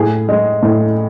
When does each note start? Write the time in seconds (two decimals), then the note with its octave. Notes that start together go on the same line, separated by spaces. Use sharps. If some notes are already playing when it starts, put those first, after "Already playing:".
Already playing: A2 G#4
0.29 G#3
0.63 A2